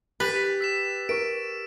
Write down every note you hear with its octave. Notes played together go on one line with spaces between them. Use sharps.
G4 B4 A6 B6
E6 B6 E7
A#4 C#6 B6 D7